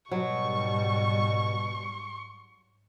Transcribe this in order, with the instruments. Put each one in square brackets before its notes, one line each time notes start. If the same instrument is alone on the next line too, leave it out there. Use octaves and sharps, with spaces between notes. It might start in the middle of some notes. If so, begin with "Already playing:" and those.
[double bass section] G#2 G3 [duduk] B2 [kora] F#3 [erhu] C#6